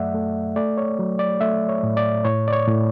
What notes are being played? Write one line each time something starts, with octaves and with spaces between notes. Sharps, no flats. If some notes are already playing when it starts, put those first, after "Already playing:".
Already playing: F#2 F#3 A3 D5 E5 F#5
A3
A3 D5
C#5
F#3
D5
A3 E5
C#5
A2
D5
A2 C#5
D5
C#5
A2